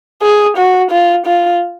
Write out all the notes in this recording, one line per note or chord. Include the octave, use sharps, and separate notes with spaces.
G#4
F#4
F4
F4